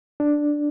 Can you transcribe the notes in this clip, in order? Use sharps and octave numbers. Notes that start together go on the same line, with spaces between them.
D4